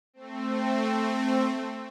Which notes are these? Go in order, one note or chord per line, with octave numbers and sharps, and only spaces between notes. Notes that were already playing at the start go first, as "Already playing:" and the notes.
A3 C4